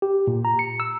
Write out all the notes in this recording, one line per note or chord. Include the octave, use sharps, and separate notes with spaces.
G4
A#2
A#5
C#7
E6